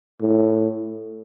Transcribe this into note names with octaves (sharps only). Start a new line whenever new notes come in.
A2